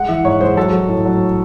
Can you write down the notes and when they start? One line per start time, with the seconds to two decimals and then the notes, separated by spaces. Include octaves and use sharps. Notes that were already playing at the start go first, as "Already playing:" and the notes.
Already playing: G#3 F#5
0.08 E3 E5
0.24 G#2 C#5
0.41 G#3 C5
0.56 F#3 A4
0.73 F#3
0.89 A2
1.05 F#3